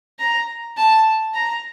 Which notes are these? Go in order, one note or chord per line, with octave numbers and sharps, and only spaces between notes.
A#5
A5
A#5